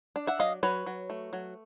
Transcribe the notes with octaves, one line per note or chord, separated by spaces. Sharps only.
D4
E5 F#5
F#3 D#5 F5
F#3 B4 C#5
F#3
A3
F#3